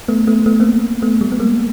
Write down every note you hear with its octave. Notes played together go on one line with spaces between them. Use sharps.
A3 B3
A3 B3
A3 B3
A#3 C4
A3 B3
G3 A3
B3
G#3 A#3